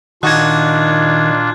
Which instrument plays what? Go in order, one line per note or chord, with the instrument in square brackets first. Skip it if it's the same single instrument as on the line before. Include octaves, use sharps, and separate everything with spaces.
[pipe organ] A#2 D4 F4 [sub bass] D#3 [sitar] D#4 F#4 [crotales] F#6 G#6